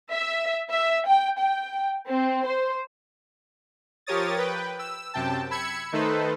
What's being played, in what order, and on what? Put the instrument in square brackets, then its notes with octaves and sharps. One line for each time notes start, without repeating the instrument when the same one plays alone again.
[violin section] E5
E5
G5
G5
C4
C5
[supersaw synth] F3 G4 A#4 C#5 D#6 A6
B4 G5
E6
F#2 C3 G5 A5
B5 E6 G#6 C#7
D#3 A3 D#4 A4 B4 C5